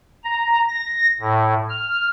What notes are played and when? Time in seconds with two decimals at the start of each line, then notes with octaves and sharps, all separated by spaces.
0.24 A#5
0.69 A#6
1.20 A2
1.70 F6